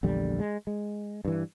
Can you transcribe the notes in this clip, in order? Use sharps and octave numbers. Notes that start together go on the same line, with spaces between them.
A#1 E2 D3 G3
G#3
G#3
G2 E3